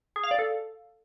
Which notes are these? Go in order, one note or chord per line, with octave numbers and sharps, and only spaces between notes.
G#4
F5
D5
A4